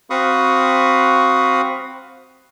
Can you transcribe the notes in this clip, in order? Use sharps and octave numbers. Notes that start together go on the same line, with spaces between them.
C4 F#4 F5 B5 C#6 D#6